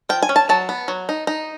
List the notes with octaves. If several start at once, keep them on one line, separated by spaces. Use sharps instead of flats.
F3 G5
G#5
C#4
A5
F#3 A5
B3
F#3
D#4
D#4